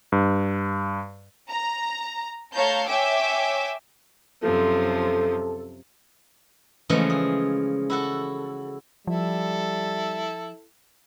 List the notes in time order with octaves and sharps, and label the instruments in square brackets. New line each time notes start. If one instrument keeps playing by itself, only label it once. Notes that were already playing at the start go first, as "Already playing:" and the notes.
[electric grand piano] G2
[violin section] A#5
A3 C#5 F5 A5 A#5 G6
C#5 E5 G5 G#5 D6 E6
[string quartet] F#2 C3 F3 [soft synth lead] A4
[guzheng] C#3 E3 F3 G#3 A3
G#4
E4 F#4 A4
[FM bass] F3 [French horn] G3 [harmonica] E4 A4